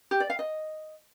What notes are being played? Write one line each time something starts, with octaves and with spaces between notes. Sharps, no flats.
G4
D5
F5
D#5